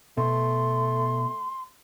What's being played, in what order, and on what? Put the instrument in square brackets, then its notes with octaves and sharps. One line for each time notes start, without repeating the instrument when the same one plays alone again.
[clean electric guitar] B2 [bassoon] A3 [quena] C6